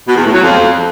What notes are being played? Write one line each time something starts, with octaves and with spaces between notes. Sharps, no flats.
B2
E2
A2
F#3
F2